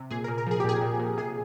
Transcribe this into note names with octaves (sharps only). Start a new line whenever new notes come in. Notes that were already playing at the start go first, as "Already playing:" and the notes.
Already playing: C3
A#2 G#4
A#2 A#4
A#4
F3 G#4
G4
A#2 G#4
A#2
A#2
C3 G#4